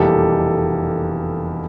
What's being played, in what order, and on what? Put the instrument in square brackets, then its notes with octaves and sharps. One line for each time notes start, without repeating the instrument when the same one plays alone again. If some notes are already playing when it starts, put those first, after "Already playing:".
Already playing: [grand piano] F1 E2 B2 G3 A#3 G4 A4